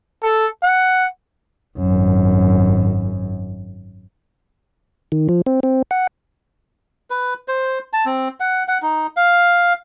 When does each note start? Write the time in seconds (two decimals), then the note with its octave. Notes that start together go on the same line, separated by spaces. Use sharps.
0.23 A4
0.63 F#5
1.78 G#1 F#2
5.12 D#3
5.29 F3
5.46 C4
5.63 C4
5.91 F#5
7.10 B4
7.48 C5
7.93 A5
8.05 C4
8.40 F#5
8.68 F#5
8.82 D#4
9.17 F5